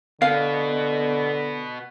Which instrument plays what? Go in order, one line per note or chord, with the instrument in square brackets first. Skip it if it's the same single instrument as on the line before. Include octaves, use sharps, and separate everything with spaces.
[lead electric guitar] B2 B3 [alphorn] D3 [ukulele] F5